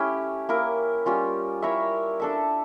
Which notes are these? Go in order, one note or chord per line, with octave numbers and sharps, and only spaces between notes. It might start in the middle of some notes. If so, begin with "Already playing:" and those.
Already playing: A3 C#4 E4 G4
A#3 E4 A#4
G3 C#4 F4
E4 A#4 C#5 E5
D4 A4 E5